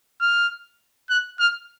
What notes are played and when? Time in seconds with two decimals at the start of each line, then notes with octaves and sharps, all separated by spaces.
0.21 F6
1.10 F#6
1.39 F6